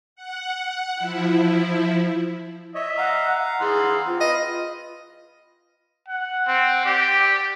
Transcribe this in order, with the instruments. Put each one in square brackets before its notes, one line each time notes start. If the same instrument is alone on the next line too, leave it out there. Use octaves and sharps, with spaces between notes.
[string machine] F#5
F3 E4
[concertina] C#5 [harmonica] D#5 E5
[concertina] F5 A#5 [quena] F#5
[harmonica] E3 F#5 C6 [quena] G#4
[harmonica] C4 [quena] F4
[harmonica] B4 [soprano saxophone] D#5
[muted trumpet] F#5
[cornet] C4
[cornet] G4 [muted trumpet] D5